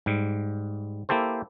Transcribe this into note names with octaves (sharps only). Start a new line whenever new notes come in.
G#2 G3
A#3 E4 G4 A4 C5